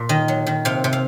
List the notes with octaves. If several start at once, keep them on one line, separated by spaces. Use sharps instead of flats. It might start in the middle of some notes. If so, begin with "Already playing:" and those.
Already playing: A#2
D#3 D#5
F#3
D#3
C3 F5
C3
F5